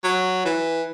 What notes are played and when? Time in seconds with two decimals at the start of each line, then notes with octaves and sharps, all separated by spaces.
0.04 F#3
0.45 E3